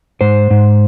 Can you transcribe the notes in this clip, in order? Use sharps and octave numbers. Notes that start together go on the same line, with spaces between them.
G#2 C5
G#2